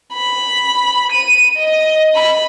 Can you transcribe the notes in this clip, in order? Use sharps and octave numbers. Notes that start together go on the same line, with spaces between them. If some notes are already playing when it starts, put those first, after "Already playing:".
B5
D#7
D#5
B5